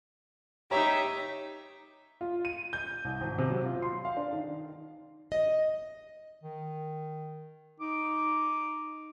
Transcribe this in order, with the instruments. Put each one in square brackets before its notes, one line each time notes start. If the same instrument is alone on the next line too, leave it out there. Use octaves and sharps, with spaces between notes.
[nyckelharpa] D#4 E5 [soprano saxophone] G4 [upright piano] C#5 A#5
[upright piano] F4
D#7
G6
C2
G#1
C3
F#3
F4
C6
F5
D4
D#3
[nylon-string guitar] D#5
[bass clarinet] D#3
[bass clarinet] D#4 [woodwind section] D6